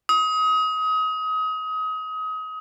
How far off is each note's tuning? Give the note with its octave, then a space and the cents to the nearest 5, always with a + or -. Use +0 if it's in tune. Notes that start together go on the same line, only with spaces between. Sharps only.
D#6 +30